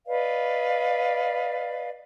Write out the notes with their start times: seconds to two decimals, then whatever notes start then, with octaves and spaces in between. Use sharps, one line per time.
0.06 B4 D5 D#5 F5